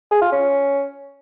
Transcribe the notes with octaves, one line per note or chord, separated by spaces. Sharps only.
G#4
F4
C#4